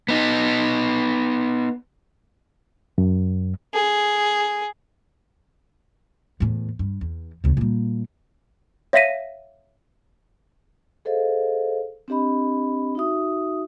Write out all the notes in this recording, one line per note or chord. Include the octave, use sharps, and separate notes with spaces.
B3 D#4
F#2
G#4
E2 A2
G2
E2
D2 C#3
A#2 G3
C#5 E5 F5 A#6 B6 D#7
G#4 A4 C5 D#5 F5
C4 D4 G4 D#5 B5
D#4 F#4 E5 D#6